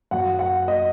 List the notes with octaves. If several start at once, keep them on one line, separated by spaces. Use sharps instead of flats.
F#2 F#3 F#5
F#5
D#5